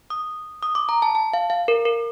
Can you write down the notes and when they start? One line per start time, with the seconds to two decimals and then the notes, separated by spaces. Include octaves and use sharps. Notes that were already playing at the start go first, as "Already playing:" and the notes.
0.10 D#6
0.63 D#6
0.75 D6
0.89 A#5
1.02 A5
1.15 A5
1.33 F5
1.50 F5
1.68 A#4
1.85 A#4